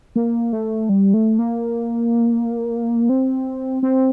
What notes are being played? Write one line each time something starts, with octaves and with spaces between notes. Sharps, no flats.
A#3
A3
G3
A3
A#3
C4
C4